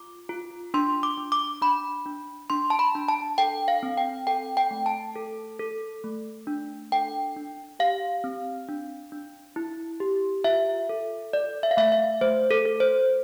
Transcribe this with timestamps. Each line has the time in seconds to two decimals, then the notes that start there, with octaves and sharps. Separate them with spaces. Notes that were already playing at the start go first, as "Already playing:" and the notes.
Already playing: F4 D6
0.29 F4
0.74 D4 C6
1.03 D6
1.17 D4
1.32 D6
1.61 D4 B5
2.06 D4
2.50 D4 C6
2.70 A5
2.79 B5
2.95 D4
3.09 A5
3.38 A4 G5
3.68 F5
3.83 C4
3.98 G5
4.27 A4 G5
4.57 G5
4.71 A3
4.86 A5
5.15 A4
5.59 A4
6.04 A3
6.47 D4
6.92 A4 G5
7.37 D4
7.80 G4 F5
8.24 C4
8.69 D4
9.12 D4
9.56 E4
10.00 G4
10.44 F4 E5
10.89 A4
11.33 A4 D5
11.63 E5
11.71 F5
11.77 A3 E5
11.92 E5
12.21 A3 C5
12.51 A4
12.66 A4
12.80 C5